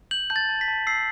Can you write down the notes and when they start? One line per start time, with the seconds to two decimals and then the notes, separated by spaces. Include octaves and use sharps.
0.11 G6 F#7
0.30 A5 G6
0.36 A6
0.49 A5
0.61 B6
0.68 A5
0.87 E6 C7